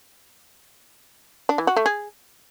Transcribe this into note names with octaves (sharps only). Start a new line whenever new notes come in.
D4
E3
F#4
A3
G#4